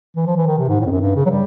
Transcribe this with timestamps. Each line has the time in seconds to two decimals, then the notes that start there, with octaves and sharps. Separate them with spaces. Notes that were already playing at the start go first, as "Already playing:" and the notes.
0.16 E3
0.26 F3
0.37 E3
0.47 D#3
0.58 C3
0.68 G#2
0.80 A2
0.86 F2
0.91 F#2
1.01 G2
1.16 C#3
1.26 F#3
1.29 G3